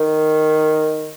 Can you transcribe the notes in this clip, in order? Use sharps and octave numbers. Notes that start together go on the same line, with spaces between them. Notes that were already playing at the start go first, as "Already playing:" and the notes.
Already playing: D#3